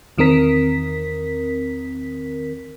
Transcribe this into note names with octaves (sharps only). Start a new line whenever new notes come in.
E2 D#3 C4 A#4 B6